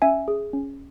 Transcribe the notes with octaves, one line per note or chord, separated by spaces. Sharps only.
C#4 E5 G#5
G#4
C#4